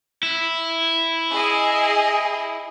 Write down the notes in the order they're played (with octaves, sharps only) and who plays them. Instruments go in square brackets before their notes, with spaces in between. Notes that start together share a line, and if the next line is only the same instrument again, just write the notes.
[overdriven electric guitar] E4
[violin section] G#4 D#5